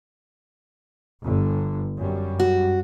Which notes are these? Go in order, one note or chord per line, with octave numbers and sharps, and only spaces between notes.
G1 D3
F#2 G3
F#4